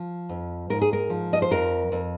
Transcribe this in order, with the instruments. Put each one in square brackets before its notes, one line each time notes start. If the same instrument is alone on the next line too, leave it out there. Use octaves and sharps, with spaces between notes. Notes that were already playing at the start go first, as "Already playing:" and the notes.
Already playing: [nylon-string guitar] F3
F2
G#2 A#4
G#4
A#4
F3
D#5
C5
F2 A#4
F2